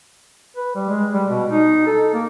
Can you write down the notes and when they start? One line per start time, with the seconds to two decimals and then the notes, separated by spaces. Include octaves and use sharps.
0.56 B4
0.75 G3
0.89 G#3
1.14 G3
1.28 B2
1.51 D#4
1.87 A4
2.14 A#3